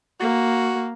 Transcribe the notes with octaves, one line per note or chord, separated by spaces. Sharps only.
A#3 F#4